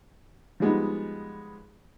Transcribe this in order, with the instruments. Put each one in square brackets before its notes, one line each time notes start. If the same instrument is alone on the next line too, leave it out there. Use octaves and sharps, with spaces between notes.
[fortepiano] F3 G3 G#3 B3 D#4